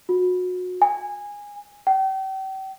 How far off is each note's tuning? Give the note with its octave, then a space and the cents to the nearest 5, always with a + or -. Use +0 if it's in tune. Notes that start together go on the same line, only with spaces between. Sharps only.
F#4 -30
G#5 -15
G5 -35